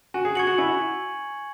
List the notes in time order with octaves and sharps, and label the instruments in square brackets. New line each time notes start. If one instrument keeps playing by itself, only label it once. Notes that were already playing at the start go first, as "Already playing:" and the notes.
[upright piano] F#4 [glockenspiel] G#5
[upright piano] G#4
[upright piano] F#4 [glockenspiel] C#6 G#6 C#7 F#7
[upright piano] F#4
[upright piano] E4 [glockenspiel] G#5
[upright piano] F#4